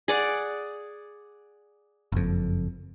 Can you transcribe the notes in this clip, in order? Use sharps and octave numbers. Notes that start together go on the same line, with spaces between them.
G#4 D5 F#5
F#1 F2